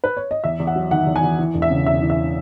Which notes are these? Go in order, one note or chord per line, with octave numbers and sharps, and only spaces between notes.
B4
C#5
D#5
E2 E5
E2
F#5
F#3
D#3 F#5
E2
G#5
E2
E3
E1
E5
C#3
E2 E5
E3
E5